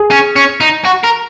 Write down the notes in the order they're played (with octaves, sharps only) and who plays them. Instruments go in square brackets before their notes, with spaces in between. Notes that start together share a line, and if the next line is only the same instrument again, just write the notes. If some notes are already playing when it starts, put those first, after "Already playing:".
Already playing: [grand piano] G#4
[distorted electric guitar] C#4
C#4
D#4
F#4
A#4